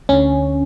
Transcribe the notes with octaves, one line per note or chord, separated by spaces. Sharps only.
D2 D3 C#4